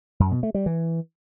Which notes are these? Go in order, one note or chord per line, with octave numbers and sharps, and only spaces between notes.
F#2
B2
A3
G3
E3